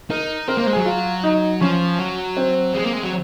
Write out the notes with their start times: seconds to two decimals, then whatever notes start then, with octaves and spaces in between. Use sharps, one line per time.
0.10 D#4 A#4
0.48 C4 A#4
0.58 A#3 C5
0.67 G#3
0.73 F#3 G#4
0.86 F4
1.24 D#4
1.61 F3 C#4
1.99 F#3
2.37 C4
2.74 G#3
2.85 A#3
2.93 G#3
3.03 F#3